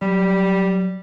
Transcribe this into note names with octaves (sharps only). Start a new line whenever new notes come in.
F#3 G3